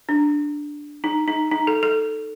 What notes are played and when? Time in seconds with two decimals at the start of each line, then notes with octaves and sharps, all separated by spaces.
0.09 D4
1.04 D#4
1.28 D#4
1.51 D#4
1.67 A4
1.83 A4